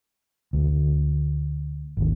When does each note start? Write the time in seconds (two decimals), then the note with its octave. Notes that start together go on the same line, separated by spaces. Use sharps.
0.53 D2
1.97 G#1 D#2